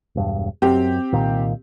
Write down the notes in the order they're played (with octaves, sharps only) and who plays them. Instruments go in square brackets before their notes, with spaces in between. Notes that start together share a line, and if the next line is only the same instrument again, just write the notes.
[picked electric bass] E1 G2
[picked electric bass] F#2 [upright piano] C4 G4
[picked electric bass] C2 A#2 D#3